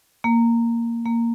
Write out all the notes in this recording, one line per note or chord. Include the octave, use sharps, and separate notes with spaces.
A#3
A#3